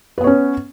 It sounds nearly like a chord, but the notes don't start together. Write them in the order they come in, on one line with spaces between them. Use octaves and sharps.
B4 B3 C#5 C#4